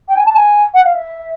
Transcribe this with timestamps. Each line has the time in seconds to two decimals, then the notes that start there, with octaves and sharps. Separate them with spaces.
0.08 G5
0.16 G#5
0.25 A5
0.35 G#5
0.74 F#5
0.84 F5
0.94 E5